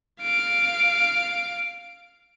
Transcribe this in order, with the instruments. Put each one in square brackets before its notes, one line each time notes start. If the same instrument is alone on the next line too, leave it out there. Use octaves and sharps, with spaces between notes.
[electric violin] F5 D7